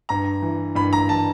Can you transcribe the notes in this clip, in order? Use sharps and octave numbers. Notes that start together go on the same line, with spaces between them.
G2 A#5
E3
G2 B5
A#5
E3 A5